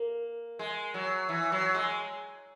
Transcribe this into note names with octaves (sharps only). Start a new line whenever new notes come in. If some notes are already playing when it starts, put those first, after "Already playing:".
Already playing: A#3
G#3
F#3
E3
F#3
G#3